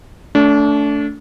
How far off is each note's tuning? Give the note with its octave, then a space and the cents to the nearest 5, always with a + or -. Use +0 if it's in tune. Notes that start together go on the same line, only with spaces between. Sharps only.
A3 +0 D4 -30